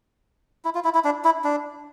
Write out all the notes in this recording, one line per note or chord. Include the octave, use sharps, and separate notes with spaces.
E4
F4
E4
E4
D4
E4
D4